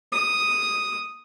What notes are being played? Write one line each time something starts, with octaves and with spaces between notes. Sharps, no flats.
D#6